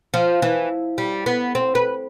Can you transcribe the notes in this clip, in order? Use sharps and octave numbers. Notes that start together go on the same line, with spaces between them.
F3
E3
G3
B3
C4
B4